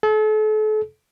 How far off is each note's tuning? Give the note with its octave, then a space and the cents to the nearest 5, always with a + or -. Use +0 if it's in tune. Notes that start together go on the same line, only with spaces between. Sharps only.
A4 -40